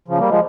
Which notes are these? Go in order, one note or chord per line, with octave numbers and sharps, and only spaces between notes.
C#3 F3
G3 A#3
F3 G#3